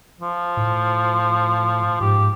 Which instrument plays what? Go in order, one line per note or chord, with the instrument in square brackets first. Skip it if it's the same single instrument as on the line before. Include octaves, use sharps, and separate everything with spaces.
[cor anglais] F3
[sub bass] A2
[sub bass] G#2 [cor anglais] G4